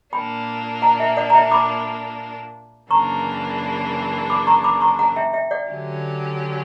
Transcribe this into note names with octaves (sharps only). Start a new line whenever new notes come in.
A#2 A#3 D4 G5 B5
F#5 A#5
E5 G5
D5 F#5
A#5
E5 G5
B5 D6
F#2 C#3 E3 A#3 D4 A#5 C#6
B5 D6
A#5 C#6
B5 D6
A#5 C#6
F#5 A#5
E5 G5
E5 G5
D5 F#5
D3 F#3 C#4 G4